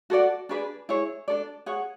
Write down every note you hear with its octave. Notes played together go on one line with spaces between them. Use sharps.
F#4 A4 D5 F#5
D4 G#4 B4 D5
E4 G#4 C#5
D4 A4 D5
G#4 C#5 F#5